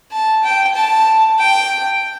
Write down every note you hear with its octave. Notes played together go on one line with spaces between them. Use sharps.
A5
G5
A5
G5